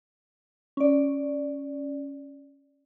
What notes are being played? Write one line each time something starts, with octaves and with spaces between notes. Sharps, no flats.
C#4 D5